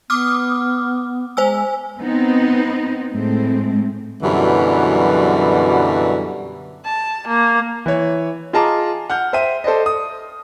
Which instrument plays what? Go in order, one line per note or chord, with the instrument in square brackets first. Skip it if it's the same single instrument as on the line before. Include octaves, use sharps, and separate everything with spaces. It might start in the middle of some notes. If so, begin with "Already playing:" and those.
[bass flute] B3 [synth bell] D6 D#6 F6
[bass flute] G#3 [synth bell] C5 G#5 E6
[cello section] B3 C4 D#4
A2 G#3 A3 C4
[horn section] F#2 B2 D3 E3 F#3 G3
[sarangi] A5
A#3
[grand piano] E3 C#5
F4 G#4 D#5 A5 A#5 D6
F#5 F6 G6
C5 E5 G5 D#7
A4 C5 D5 D#5
D#6